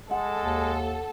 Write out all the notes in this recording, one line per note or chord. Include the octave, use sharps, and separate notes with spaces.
G#3 A4 F#5
D#2